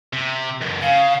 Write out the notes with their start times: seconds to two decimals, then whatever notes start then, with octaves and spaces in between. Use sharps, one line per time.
0.13 C3
0.61 C#2 F#2
0.82 C#3 F5